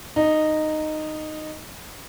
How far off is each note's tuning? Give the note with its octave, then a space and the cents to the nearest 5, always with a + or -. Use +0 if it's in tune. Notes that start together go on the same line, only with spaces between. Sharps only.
D#4 -10